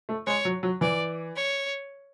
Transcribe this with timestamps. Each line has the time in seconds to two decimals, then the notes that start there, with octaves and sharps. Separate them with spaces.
0.09 A3
0.27 G#3 C#5
0.45 F#3
0.63 F#3
0.81 E3 D5
1.36 C#5